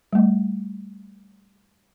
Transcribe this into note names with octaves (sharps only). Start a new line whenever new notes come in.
G3 A3